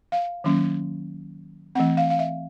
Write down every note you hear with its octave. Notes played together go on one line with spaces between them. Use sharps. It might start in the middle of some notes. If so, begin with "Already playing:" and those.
F5
D#3 F#3 A#3 C#4
E3 A3 C4 F#5
F5
F5
E5